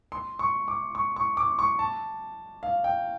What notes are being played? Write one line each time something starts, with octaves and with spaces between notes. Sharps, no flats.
C6
C#6
D6
C#6
C#6
D6
C#6
A5
F5
G5